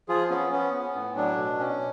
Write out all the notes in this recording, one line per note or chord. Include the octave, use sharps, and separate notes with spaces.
F3 F4 G#4
B3 C#4
B3 C#4
B3
A2
F#3 D4
B2
C#4